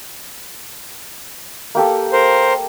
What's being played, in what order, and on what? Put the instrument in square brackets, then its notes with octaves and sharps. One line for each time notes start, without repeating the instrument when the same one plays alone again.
[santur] A#3 G4 A4
[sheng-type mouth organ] A#4 C5